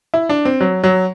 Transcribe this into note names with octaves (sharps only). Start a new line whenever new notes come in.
E4
D4
C4
F#3
F#3